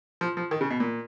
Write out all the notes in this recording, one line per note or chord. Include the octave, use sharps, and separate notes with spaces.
F3
F3
D#3
C#3
B2
A#2